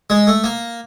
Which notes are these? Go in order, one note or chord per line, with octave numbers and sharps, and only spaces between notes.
G#3
A3
A#3